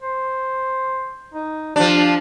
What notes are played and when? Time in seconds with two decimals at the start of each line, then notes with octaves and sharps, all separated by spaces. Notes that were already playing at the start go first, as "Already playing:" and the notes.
0.02 C5
1.34 D#4
1.76 F3 D4 G4